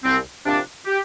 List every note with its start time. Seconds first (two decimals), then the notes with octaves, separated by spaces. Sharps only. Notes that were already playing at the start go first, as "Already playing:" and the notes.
0.04 C2 C4
0.45 C3 F3 A#3 D4
0.86 G4